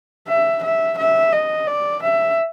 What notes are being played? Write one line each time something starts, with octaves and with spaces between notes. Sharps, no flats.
E5
E5
E5
D#5
D5
E5